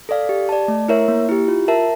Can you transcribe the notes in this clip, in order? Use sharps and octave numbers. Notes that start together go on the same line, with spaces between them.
A4 D5 F5
G4
D5 A5
A3
E4 A#4 C#5 E5
A#3
E4 G4
F4
A#4 E5 A5